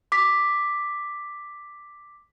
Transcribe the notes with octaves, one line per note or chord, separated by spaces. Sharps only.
D6 B6